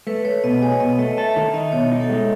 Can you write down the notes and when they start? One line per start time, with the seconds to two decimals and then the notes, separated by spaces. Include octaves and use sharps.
0.07 A3 B4
0.25 A3 C#5
0.44 B2 D#5
0.62 G#4 C#5
0.80 B2 D#5
0.98 A3 D#5
1.18 A4 E5
1.36 D#3 E5
1.54 D#4 D#5
1.66 D#5
1.72 B2 C#5
1.92 D#4
2.00 A4
2.10 G#3